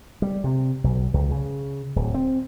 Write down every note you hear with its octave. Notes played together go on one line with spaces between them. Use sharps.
G3
C3
B1
C#2
C#3
D1
C4